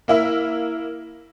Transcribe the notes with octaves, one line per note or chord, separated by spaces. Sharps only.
A#3 E4 E5